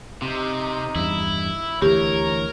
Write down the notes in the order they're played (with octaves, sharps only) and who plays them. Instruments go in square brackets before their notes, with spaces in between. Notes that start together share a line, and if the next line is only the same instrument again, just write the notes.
[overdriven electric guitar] C3 [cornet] D#4
[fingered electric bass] E2 G2 [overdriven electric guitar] E4
[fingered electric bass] D2 E3 [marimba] G4 [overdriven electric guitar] A#4 [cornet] C#5